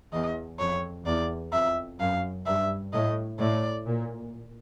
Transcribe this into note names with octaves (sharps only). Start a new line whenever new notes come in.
E2 D#5
F2 C#5
E2 D5
F2 E5
F#2 F5
G2 E5
A2 D#5
A2 D5
A#2